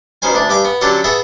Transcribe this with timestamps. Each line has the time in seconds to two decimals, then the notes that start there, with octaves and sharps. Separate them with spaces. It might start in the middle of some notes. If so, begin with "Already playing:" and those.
0.22 B2 D#3 C#4 C5 G#5
0.35 D2 D4 D#6
0.49 G2 G4 G#5 D6
0.65 B3
0.81 D3 F#3 C#4 G4 A4 C#5
1.04 B3 G#4 A4 E5